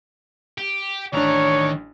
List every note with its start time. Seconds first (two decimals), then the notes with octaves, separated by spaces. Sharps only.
0.58 G4
1.13 A1 D#3 D4 C#5 A#5